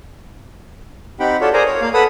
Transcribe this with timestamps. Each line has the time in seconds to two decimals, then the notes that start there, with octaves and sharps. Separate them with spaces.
1.20 C4 D#4 G4 F#5 G5 B5
1.41 F4 F#4 A4 C#5 D5
1.53 G#4 A#4 C5 D5 G#5 A#5
1.66 C#5
1.81 A#3 F5
1.94 A4 B4 F#5 B5 D#6